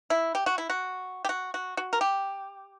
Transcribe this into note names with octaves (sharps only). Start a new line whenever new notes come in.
E4
G4
F#4
E4
F#4
G4
F#4
F#4
F#4
A#4
G4